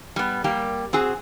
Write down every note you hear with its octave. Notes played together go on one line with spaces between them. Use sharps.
G3 B3
G3 A#3 G4
C4 F#4 G#4